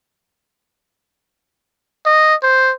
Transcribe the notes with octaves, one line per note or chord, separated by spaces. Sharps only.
D#5
C5